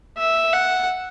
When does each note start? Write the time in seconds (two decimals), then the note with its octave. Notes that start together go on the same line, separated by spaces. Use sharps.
0.18 E5
0.53 F#5